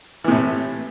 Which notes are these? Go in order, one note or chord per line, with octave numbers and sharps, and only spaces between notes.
A2 C3 E3